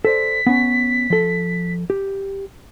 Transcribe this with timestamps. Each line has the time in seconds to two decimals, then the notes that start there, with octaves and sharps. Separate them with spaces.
0.05 A4 C5 D5 B6
0.47 B3 C#4
1.10 F3 A4
1.90 G4